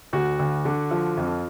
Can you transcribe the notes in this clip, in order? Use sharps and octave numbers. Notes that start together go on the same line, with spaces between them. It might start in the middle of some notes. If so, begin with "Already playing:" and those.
D2 F#4
D2
D3
F3
F2